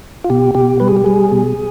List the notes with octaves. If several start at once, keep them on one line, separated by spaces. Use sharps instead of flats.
F4
B2 G4
B2 G4
G3 B4
G#4
G4
G3 G#4
B2